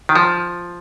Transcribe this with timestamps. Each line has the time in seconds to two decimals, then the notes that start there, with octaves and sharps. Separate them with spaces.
0.09 D#3
0.16 F3